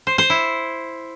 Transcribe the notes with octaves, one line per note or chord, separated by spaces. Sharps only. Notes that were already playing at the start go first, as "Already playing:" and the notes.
C5
C5
E4